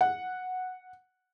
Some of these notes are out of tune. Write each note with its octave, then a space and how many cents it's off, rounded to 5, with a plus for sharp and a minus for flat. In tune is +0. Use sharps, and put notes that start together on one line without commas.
F#5 -5